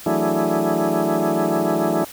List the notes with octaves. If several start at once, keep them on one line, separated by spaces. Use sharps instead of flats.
E3 F#3 A3 D4 E4 G#4